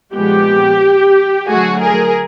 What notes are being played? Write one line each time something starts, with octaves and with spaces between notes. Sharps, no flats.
A#2 F3 G#3 B3 G4
D3 F#3 A3 F#4 G#4
G#4 A#4